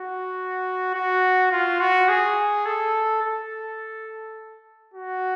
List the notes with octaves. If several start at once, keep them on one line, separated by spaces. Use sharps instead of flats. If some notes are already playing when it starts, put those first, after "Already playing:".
Already playing: F#4
F#4
F4
F#4
G#4
A4
A4
F#4